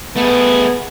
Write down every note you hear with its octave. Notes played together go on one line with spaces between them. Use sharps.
A3 B3 G#4